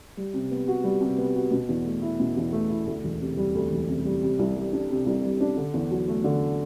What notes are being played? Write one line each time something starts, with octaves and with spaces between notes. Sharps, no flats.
G3
C3
B3
F#4
G3
C3
B3
F#4
B2
E2
A3
E4
B2
E2
A3
E4
D2
E1
C3
G3
D2
E1
C3
G3
C3
C2
G3
D4
C3
C2
G3
D4
D3
E2
F#3
A3
D3